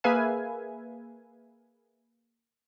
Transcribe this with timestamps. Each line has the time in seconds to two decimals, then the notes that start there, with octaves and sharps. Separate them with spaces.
0.04 A#3 G#4 B4 E5 F5 G#5